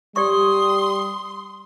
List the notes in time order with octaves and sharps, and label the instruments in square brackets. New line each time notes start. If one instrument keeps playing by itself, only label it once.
[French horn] G3 [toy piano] G4 D5 C#6 [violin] C6 [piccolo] D#6